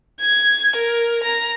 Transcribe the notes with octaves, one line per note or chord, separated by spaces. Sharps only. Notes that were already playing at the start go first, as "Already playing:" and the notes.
G#6
A#4
A#5